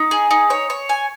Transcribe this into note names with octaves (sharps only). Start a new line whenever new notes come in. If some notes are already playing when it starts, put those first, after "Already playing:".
Already playing: D#4
G#4
D#4
C#5
C#5
G#5